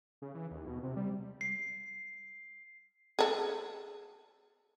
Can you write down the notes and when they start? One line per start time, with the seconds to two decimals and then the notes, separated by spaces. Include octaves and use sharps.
0.22 C#3
0.34 E3
0.51 D#2
0.67 B2
0.83 C3
0.96 G3
1.41 C7
3.19 G#4 A4